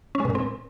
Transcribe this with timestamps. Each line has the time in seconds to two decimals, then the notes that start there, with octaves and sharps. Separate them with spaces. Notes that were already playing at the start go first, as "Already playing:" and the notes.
0.15 C#4
0.20 G#3
0.25 B2
0.30 A#2
0.35 C4